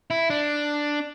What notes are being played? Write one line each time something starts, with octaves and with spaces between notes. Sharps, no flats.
E4
D4